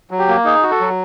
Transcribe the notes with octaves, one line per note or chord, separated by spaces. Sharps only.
F#3
G4
A#3
D#4 G#4
F#4
A4
F#3